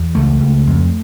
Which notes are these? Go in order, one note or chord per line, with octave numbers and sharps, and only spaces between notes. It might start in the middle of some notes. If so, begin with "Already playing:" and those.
Already playing: E2
C#2 A3
C#2
F2